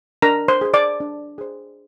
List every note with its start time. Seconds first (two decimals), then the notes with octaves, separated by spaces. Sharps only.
0.22 D4 A#4 A#5
0.48 C5 C6
0.61 G#4 C5
0.74 D5 D6
1.00 D4
1.38 G#4 C5